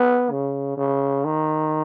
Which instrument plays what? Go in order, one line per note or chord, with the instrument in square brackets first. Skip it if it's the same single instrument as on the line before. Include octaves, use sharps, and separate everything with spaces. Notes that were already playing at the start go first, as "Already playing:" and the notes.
Already playing: [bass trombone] B3
C#3
C#3
D#3